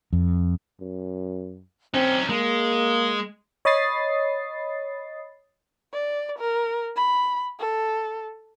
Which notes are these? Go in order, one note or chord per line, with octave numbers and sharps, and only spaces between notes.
F2
F#2
C4 C#4 D#4
G#3 A#3
C#5 D#5 B5 D#6 A6 C7
D5
A#4
B5
A4